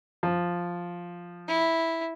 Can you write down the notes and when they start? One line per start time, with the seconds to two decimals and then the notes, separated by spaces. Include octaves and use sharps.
0.23 F3
1.48 E4